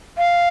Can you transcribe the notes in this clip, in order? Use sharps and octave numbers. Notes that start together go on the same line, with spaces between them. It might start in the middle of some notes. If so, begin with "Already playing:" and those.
F5